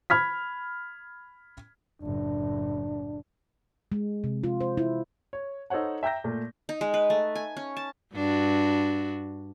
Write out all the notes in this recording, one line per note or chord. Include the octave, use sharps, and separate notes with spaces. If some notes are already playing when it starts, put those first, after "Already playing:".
B5 F6 G#6 B6
F#1 A2 D4
G#3
C3
F4
C5
E4
C#5
D#4 A4 C5 C#5 F#5
E5 G5 A#5 G6 A#6
A#2 A3
D#4
G#3
B4
A3
G#5
C#4
A5
G2 D4 F#4